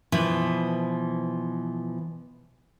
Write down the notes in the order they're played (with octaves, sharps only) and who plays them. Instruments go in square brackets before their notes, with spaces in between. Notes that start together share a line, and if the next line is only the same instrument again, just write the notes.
[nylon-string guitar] B2 E3 F3